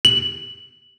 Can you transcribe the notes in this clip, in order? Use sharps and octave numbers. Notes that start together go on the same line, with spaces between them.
F#7